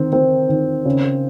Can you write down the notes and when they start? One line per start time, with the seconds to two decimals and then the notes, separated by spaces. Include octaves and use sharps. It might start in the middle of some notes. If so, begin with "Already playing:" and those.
Already playing: D#3 C4
0.13 C4
0.49 D#3
0.85 C#3